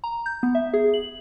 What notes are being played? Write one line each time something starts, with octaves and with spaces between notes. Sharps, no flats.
A#5
G6
B3
E5
G#4
F#7